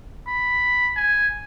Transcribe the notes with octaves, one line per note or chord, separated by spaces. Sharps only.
B5
G#5